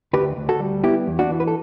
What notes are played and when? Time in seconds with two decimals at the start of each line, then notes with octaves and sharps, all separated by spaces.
0.13 D2 G4 B4
0.37 D2
0.49 F#4 A4
0.60 G3
0.84 B3 E4 G4
1.07 E2
1.19 D4 F#4
1.30 E3
1.40 B4
1.47 A4